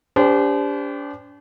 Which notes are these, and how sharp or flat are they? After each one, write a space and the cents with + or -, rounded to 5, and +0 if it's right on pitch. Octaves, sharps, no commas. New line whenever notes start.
D4 -40 G4 +25 C5 -40